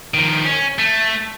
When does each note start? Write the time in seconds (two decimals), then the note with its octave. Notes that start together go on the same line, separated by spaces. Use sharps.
0.14 D#3 F3
0.45 C#4
0.79 A3